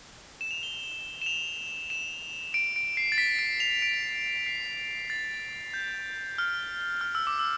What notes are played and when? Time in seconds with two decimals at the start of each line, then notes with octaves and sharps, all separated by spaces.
0.41 E7
0.51 F7
0.63 G7
1.22 E7
1.26 F7
1.90 E7
2.54 D7
2.76 D7
2.97 C7
3.12 A6
3.18 B6
3.39 D7
3.60 F7
3.82 D7
4.46 C7
5.10 A6
5.74 G6
6.38 F6
7.01 F6
7.15 E6
7.27 D6
7.39 E6